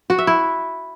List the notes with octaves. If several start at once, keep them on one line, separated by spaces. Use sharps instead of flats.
F#4
E5
E4